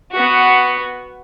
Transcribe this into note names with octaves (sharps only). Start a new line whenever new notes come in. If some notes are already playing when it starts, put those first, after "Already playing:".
B3 F#4